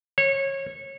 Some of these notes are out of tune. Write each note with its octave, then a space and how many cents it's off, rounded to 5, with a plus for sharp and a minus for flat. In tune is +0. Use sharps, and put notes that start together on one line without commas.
C#5 -20